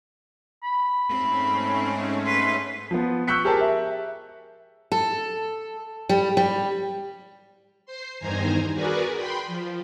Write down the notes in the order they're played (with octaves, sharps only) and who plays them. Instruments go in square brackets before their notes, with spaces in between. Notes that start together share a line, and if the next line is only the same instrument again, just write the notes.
[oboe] B5
[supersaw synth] G#2 A3 C#4 [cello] C4
[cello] B4 [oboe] C6
[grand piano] F3 B3
C#6 E6 F#6 G6 B6 C#7
G4 G#4 A#4 C5 A5
E5
[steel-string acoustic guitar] A4
G3
G3
[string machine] C5 C6
E2 G2 D#3 C5 G#5 A#5
F#4 G#4 A#4 B4 D5 G#5
G5 B5 C6
F3